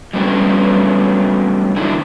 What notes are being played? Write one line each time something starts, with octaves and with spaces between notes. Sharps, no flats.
F#3 G3 A3 B3 C#4 D4
D3 D#3 D4 E4